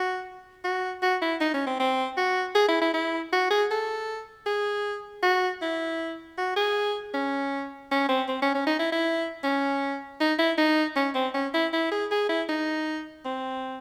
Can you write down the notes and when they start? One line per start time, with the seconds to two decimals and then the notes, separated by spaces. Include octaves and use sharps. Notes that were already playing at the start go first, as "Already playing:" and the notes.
Already playing: F#4
0.65 F#4
1.03 F#4
1.22 E4
1.41 D#4
1.54 C#4
1.67 C4
1.80 C4
2.17 F#4
2.55 G#4
2.68 E4
2.82 E4
2.94 E4
3.33 F#4
3.51 G#4
3.71 A4
4.46 G#4
5.23 F#4
5.62 E4
6.38 F#4
6.57 G#4
7.14 C#4
7.91 C#4
8.09 C4
8.28 C4
8.42 C#4
8.54 C#4
8.67 D#4
8.79 E4
8.92 E4
9.43 C#4
10.20 D#4
10.39 E4
10.58 D#4
10.96 C#4
11.15 C4
11.34 C#4
11.54 E4
11.73 E4
11.92 G#4
12.11 G#4
12.29 E4
12.49 D#4
13.25 C4